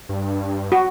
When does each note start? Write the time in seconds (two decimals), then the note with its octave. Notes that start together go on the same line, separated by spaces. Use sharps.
0.09 G2
0.72 F#4